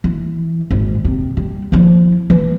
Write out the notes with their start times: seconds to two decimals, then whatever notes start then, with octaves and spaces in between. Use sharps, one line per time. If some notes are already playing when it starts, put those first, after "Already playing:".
0.04 E3
0.71 G#1 G#2
1.05 C3
1.37 G3
1.72 F3 E4
2.30 E3